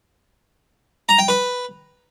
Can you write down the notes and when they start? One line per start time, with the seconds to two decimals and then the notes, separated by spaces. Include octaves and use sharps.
1.09 A#5
1.19 G5
1.28 B4